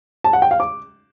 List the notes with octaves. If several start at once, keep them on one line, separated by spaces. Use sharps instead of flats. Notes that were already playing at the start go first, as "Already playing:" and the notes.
A5
F#5
G5
F5
D6